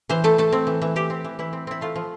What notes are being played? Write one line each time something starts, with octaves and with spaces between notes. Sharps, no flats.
E3 C5
A3 A4
A3 A4
C4
E3
E3
E3 G4
C4
E3
E3 E4
C4
C4 E4
A3 F4
F3